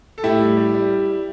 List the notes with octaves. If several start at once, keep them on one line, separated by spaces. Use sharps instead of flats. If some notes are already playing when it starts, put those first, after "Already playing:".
A4
A2 E4 G4
G3
G3
G3